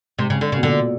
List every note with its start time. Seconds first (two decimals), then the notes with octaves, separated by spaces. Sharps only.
0.19 G#2 C3
0.30 C#3
0.41 D3
0.52 C#3
0.56 B2
0.63 A#2 D3